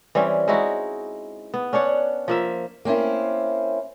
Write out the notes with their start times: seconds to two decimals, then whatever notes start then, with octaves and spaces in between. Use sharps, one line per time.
0.15 E3 G3 C4 C#4
0.48 G#3 D#4 E4 F#4
1.54 B3
1.73 C#4 D4 C#5 F#5
2.28 F3 A#3 E5
2.85 A#3 C4 C#4 E4